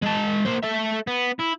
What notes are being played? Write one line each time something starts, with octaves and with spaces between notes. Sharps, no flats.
G#3 A5
A#3 C5
A4 E5
B3
E4